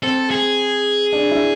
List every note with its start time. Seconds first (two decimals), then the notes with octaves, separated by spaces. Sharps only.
0.03 C4 A4
0.31 G#4
1.13 D4
1.31 E4